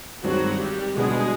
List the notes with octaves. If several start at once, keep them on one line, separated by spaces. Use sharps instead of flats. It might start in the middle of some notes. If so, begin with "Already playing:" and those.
G2 D#3 F#3 G#3 C4 F#4
G3 G4
B2 G3 G#3 B3 D4 G#4